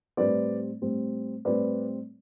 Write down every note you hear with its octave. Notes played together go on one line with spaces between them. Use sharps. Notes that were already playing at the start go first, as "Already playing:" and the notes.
A2 G3 C4 B4 D5
A2 G3 C4
A2 G3 C4 B4 D5